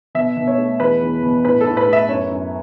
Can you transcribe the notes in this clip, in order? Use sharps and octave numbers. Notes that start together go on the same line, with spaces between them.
B2 E5
B2
C#5
A3
E2 B4
E2
B2
A2 B4
A4
A2
B4
A3
E5
F#2 C#5
F#2